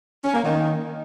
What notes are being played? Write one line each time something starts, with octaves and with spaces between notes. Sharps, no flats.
C#4
A#3
D#3